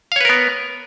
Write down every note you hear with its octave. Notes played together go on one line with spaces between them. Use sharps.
B3 A#4 B4 C#5 F5